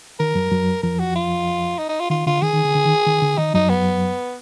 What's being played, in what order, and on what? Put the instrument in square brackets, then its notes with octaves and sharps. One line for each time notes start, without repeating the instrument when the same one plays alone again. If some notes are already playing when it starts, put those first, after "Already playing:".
[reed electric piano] D#3 [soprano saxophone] A#4
[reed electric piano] F#2 F#3
F#2 F#3
[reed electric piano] F2 F3 [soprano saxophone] A#4
[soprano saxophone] F#4
F4
D#4
D#4
F4
[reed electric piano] D#3 [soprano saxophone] F4
[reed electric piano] D3 [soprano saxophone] F4
[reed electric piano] D#3 [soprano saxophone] G#4
[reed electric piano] D#3
D3
D3
D#3
D#3
D3
[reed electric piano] D#3 [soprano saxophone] D#4
[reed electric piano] F#2 F#3 [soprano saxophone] D#4
[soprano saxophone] B3